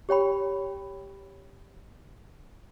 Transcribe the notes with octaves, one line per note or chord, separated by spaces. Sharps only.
G4 C#5 G5 B5